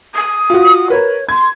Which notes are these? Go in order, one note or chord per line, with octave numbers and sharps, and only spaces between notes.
D#6
F4 F#4
A#4 B4 C#5
C6 G#6